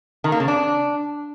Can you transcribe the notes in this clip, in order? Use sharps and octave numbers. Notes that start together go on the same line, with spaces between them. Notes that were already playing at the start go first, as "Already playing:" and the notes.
D#3
A#3
C#3
D4